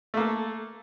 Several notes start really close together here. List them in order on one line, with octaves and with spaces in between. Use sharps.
A3 A#3 A4